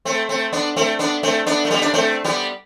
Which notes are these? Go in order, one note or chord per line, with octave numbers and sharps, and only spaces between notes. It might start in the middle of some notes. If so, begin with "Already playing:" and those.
A3 C4
A3 C4
B3 D4
A3 C4
B3 D4
A3 C4
B3 D4
A3
G3 B3
D4
A3 C4
G3 B3